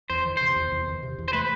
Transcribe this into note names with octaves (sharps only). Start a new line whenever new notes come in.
E2 C5
D#3
C3 C5
E2
E2
D#3
C3
E2
C5
A3 B4